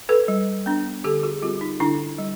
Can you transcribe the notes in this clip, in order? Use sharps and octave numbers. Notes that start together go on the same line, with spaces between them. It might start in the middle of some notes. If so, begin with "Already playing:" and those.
A4 B4
G3
B3 D4
D3 G4 A4
F#4 G#4
G3 C4 F4 G4
D#4
D3 D4 E4
G3